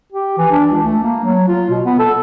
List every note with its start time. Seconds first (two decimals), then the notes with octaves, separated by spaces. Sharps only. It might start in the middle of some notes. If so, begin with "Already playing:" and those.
0.12 G4
0.38 E3
0.51 D4
0.71 C#2
0.84 A3
1.03 A#3
1.24 F#3
1.48 F4
1.70 B2
1.86 B3
1.99 A4